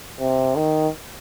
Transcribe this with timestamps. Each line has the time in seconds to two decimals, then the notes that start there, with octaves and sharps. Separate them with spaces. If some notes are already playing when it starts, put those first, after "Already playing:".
0.19 C3
0.56 D#3